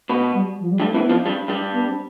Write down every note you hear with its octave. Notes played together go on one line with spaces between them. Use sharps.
B2 B3
G3
F3
G3
G2 G3 A3
E2 E3 C4
B3
F2 F3
G2 G3 C4
G2 G3
B3
C4